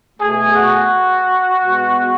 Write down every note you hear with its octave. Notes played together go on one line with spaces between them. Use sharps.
B2 A3 G#4
F#4
B2 G#3 B3